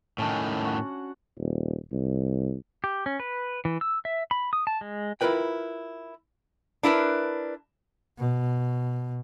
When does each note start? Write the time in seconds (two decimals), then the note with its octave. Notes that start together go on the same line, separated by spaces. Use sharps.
0.18 A2 D#3 C#4 D4
0.64 F#4 F#5
1.39 D#1
1.92 C2
2.84 G4
3.06 C#4
3.20 B4
3.65 E3
3.81 E6
4.05 E5
4.31 B5
4.53 D#6
4.67 A5
4.81 G#3
5.21 E4 F4 A#4 B4 G5
6.83 D4 E4 A#4 B4
8.18 B2